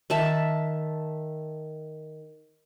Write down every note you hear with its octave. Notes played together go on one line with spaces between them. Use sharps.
D#3 E5 A5